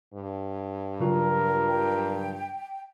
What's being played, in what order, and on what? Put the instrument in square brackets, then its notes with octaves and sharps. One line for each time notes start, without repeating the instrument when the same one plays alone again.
[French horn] G2
[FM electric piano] C#3 F#3 F4 [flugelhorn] A#4
[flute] G5